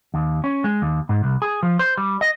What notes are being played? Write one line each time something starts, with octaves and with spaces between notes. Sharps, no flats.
D#2
C#4
G#3
D#2
G#2
C2
G#4
F3
C5
G3
D#5